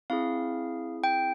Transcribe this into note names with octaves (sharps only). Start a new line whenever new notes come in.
C4 E4 G#4 F5
G5